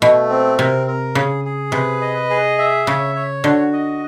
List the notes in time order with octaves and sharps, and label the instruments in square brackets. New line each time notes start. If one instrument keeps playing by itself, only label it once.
[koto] B2 [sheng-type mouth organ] A3
[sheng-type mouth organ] C4
[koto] C3 [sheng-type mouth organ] A#4
[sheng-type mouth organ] A#4
[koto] C#3 [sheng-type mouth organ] G#4
[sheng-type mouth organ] G#4
[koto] C3 [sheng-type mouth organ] B4
[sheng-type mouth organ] D#5
G#4
E5
[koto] C#3 [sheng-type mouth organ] C#5
[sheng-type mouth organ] C#5
[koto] D3 [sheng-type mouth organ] F#4
[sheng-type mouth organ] D#5